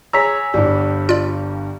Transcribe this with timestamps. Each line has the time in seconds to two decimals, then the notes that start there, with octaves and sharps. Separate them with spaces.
0.13 G#4 C#5 A#5 E6 B6
0.54 G1 G2 G3
1.09 F4 D5